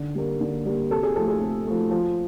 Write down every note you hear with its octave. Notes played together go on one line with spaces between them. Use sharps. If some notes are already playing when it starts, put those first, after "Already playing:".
Already playing: D3
G3 A#3
D3
G3 A#3
C3 A4
G#4
F3 A3 A4
G#4
C3
F3 A3
F3